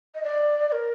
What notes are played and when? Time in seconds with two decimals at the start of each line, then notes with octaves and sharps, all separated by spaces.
0.15 D#5
0.24 D5
0.69 D5
0.72 A#4